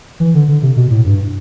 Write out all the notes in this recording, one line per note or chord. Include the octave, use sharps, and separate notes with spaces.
E3
D3
D3
C3
B2
A2
G2